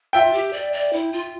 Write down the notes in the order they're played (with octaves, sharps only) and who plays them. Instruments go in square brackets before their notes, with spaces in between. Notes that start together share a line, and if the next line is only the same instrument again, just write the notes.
[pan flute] F4 [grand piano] E5 G5
[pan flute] G4
D5
D5
E4
F4